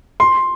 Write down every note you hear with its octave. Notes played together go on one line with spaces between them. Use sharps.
C6